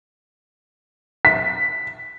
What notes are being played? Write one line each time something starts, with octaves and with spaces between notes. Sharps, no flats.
B6